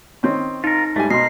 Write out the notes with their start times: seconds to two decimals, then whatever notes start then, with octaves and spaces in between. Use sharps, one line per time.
0.23 D#3 C4 C#4
0.64 D#4 F4 A#4
0.96 G#2 G3 A3 G#5
1.10 B2 A#4 C6 C7